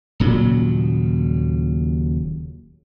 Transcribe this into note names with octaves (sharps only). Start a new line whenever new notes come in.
D#1 A#2 C#3 F#3